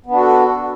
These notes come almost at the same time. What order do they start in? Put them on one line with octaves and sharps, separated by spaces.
B3 D4 F#4 A4